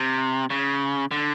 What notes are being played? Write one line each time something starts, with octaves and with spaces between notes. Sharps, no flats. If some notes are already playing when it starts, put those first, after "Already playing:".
Already playing: C3
C#3
D3